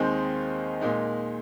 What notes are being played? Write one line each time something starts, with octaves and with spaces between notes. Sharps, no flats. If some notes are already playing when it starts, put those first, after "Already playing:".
Already playing: D#2 D#3 G#3 C4 D#4
A#2 G#3 D#4